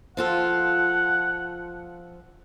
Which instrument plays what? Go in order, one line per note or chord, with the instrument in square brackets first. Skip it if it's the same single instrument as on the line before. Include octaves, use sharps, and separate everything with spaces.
[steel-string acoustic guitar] F3 F4 A4 [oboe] F#5